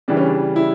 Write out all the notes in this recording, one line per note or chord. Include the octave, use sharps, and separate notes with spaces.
C#3 E3 G3 D4
C#4
D4
E4